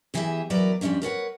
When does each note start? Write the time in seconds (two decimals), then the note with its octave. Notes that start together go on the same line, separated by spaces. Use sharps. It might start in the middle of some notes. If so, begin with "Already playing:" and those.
0.14 E2 E3 G4 G#4 D#5 E5
0.50 E2 F#3 A#4 B4 D5 A#5
0.81 F2 G3 A#3 C#4 D4
1.02 A#4 B4 C#5 F#5